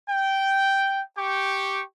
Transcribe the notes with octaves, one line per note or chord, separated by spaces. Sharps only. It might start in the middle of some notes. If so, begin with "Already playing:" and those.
G5
G4 G5 C#6 D6